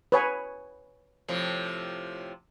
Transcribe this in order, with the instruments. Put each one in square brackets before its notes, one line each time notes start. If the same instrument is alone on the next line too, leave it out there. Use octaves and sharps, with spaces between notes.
[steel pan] B4 C#5 G#5
[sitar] A2 C3 F3